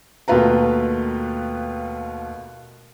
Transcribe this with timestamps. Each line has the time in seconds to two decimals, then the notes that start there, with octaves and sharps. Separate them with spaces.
0.28 D#2 B2 A3 F4 B4 A#5